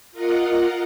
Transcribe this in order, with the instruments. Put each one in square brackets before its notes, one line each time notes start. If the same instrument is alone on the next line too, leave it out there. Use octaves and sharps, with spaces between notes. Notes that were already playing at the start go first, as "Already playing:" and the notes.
[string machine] F4 A#4 D#5 F#5